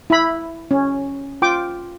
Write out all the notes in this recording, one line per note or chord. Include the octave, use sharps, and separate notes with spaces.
E4 B5
C#4
F4 G5 D6